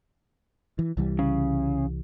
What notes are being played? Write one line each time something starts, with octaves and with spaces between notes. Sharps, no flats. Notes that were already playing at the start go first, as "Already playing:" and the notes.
E3
C2 E3 G3
C#3